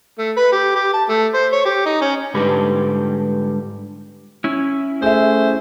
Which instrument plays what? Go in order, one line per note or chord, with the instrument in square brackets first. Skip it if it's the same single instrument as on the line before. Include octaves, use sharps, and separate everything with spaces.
[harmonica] A3
B4
G4
G4
A5
A3
C5
C#5
G4
D#4
C#4
[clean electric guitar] G#2 D3 G3 G4 B4 B5
[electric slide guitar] C#4 E4
[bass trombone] A3 [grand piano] G#4 E5 [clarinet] C5